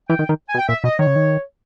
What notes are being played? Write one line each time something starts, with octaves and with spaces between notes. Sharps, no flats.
E3 G5
D#3
D#3
G#5
B2
G5
A#2 E5
B2 D#5
D#3 C#5
C#3
D#3